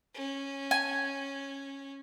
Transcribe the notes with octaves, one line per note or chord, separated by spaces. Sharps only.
C#4
G#5